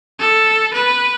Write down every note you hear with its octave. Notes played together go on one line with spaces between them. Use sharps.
A4
B4